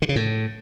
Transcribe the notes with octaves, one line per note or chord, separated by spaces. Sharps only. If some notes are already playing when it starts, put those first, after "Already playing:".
D3
C#3
A2